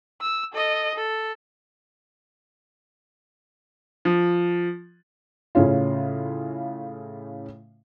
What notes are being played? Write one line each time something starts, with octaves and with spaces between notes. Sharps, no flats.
E6
A4 D#5
A4
F3
A2 C#3 C#4 F4